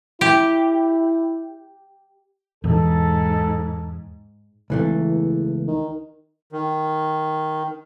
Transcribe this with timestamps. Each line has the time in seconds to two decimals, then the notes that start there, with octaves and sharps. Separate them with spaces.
0.21 E4 G4
2.64 E2 G#2 B2 A4
4.70 G#1 C#2 E3 A3
4.99 E2
5.68 D#3
6.52 D#3